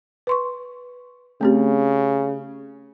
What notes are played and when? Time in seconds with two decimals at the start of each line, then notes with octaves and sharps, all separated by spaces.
0.27 B4 C6 C#6
1.41 C#3 A3 C4 G4